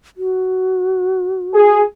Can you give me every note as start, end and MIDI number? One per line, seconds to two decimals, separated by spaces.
0.17 1.81 66
1.54 1.80 68